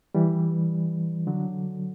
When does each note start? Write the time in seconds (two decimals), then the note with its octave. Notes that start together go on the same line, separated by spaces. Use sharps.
0.15 E3 G3
1.27 D3 F#3